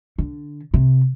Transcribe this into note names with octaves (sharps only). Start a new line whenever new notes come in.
D3
C3